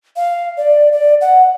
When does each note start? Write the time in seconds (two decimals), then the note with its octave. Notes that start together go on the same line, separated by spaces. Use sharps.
0.16 F5
0.57 D5
0.92 D5
1.21 F#5